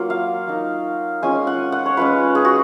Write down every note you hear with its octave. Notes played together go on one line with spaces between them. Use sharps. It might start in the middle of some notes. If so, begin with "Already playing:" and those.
Already playing: F#3 A#3 F4
F5
A#3 D#4
G#3 C#4 F4 G#5
F#5
F#5
C#5
G#3 C#4 F4 B4
G#4
F#4